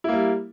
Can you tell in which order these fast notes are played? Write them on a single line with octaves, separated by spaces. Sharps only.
E4 A#3 G3